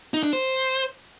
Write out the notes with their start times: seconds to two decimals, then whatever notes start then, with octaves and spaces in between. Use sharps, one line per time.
0.14 D#4
0.23 D4
0.33 C5